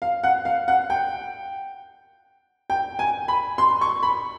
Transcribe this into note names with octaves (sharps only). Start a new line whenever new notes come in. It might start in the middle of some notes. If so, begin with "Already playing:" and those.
F5
F#5
F5
F#5
G5
G5
G#5
B5
C6
C#6
B5